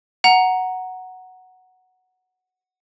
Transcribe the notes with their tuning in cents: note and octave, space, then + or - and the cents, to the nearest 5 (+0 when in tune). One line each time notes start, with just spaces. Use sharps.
F#5 +0 A#5 +0